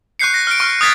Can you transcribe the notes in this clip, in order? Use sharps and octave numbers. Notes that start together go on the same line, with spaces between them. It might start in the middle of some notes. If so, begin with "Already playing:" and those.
C#6 F#6 G6 C7 C#7
A#6
F6 D7
C#6 F6
D#6 F#6 G#6 A6 B6